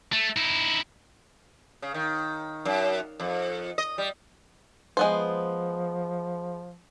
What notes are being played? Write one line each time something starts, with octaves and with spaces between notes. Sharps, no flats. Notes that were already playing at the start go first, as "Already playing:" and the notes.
A3
D#4 E4
C#3
D#3
F#2
F2
D#5
G3
F3 G#3 B3 C5